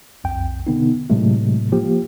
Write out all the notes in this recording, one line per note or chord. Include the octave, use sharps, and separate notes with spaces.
B1 F2 G5
B2 D3 B3 D#4
A2 C3 F#3 G#3 A3
F3 A#3 G4